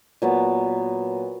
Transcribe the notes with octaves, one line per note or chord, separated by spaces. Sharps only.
A#2 F#3 B3